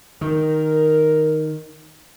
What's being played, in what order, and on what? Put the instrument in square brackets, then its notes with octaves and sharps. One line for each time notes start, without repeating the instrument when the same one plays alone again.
[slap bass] D#3 [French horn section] A#4